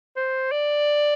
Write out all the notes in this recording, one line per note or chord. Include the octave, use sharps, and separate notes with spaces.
C5
D5